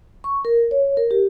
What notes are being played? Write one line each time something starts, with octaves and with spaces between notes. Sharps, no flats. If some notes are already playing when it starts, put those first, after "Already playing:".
C#6
A#4
C#5
A#4
G4